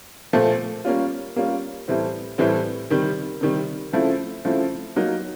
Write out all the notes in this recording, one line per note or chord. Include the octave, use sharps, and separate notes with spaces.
A#2 F3 A3
G3 A#3 C#4 F4
G3 A#3 C#4 F4
A2 E3 G3 C4
A2 E3 G3 C4
C3 D#3 G3
C3 D#3 G3
C#3 F3 A3 C4 E4
C#3 F3 A3 C4 E4
F#3 A#3 D#4